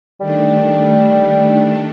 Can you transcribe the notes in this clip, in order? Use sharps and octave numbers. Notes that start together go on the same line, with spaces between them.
D#3 G3 A3 D4